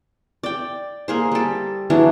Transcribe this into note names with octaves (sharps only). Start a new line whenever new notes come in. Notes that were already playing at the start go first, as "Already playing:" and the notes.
D5 G5
A#3 G#4 C5
G3 A4
E3 F#3 D4 G#4